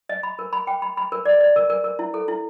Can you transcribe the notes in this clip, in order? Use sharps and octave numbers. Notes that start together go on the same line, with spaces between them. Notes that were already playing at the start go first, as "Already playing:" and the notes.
D#5
B5
A#4
B5
G5
B5
B5
A#4
D5
D5
A#4
A#4
A#4
E4
A4
E4